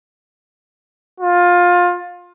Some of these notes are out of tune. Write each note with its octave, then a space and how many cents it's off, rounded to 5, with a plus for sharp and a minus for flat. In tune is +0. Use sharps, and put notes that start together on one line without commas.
F4 +20